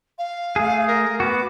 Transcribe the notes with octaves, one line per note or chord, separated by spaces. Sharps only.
F5
A3 G#4
A#4
B3 F#4 D6